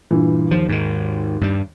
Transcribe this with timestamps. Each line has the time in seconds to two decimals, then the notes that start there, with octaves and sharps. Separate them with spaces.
0.11 G2 A#2 E3
0.51 D#2 F3
0.69 G#2 D#3
1.41 G2 G3